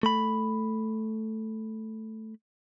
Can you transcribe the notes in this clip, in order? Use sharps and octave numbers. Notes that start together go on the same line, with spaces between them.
A3 B5